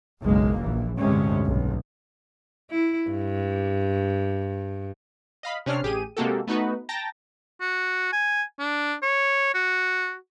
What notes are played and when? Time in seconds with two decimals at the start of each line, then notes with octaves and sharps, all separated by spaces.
0.22 F#1 B1 G#3 A#3
0.60 A#1 E3
0.98 A1 D2 G2 C3 G#3 C#4
1.44 B1
2.70 E4
3.10 G2
5.43 D#5 F5 B5
5.66 C3 C#4 D4 F6 C7
5.83 A1 G4 G#4 D#7
6.17 C3 G#3 A#3 F#4 G4 A4
6.47 A3 B3 D#4 F#4 B4
6.89 G5 A5 A#5 A6 A#6
7.61 F#4
8.13 G#5
8.59 D4
9.02 C#5
9.54 F#4